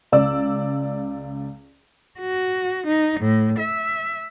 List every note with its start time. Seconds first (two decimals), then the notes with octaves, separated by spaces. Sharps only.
0.12 C#2 D5 E6
2.20 F#4
2.87 D#4
3.20 A2
3.59 E5